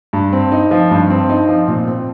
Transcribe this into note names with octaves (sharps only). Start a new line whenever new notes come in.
G2
C4
D#4
F3
G2
C4
D#4
F3
A#2
C4